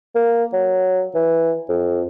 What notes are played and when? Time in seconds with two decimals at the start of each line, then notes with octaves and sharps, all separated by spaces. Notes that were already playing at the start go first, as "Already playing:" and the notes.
0.15 A#3
0.53 F#3
1.15 E3
1.69 F2